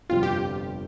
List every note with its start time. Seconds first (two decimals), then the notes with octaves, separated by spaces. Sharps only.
0.10 G1 F2 C3 G3 F4
0.23 G4